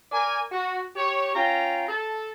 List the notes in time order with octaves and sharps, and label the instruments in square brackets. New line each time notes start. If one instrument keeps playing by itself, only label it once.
[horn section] A#4 D5 G#5
F#4
G4 C#5
C#4 F4 G5 A#5
A4 A5